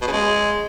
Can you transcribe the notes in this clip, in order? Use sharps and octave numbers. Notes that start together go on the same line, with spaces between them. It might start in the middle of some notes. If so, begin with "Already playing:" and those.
B2
C#3
G#3